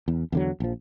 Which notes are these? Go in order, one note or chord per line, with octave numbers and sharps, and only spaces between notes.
E2
E2 D3 F#3
A#1 F3